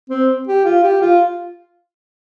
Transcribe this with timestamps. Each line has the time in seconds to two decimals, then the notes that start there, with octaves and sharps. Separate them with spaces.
0.10 C4
0.48 G4
0.65 F4
0.83 G4
1.02 F4